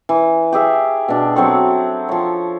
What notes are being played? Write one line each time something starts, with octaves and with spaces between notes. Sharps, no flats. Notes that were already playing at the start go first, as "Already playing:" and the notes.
E3
G4 G#4 E5 F5
B2 D4
F#3 C4 A4 C#6
F3 C#5